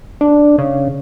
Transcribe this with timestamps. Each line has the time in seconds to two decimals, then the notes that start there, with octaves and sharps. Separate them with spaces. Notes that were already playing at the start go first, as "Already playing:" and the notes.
0.21 D4
0.58 C#3